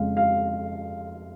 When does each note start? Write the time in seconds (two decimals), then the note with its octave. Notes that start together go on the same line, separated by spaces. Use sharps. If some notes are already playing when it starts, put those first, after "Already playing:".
Already playing: F2 C#3 G#3 F5
0.17 F5